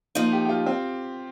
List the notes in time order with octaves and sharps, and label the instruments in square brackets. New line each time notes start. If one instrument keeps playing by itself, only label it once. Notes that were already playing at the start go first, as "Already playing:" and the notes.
[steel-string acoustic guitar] F3 A#3 D#4 [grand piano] F4
[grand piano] G4
G4
F4
C4